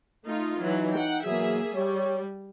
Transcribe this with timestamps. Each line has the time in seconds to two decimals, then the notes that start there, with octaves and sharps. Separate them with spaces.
0.25 A3 D#4 F4
0.61 E3 F#3 D#4
0.93 F#5 G5
1.24 B2 E3 F#3 A#3 G#4 E5
1.75 G3 G4 C#5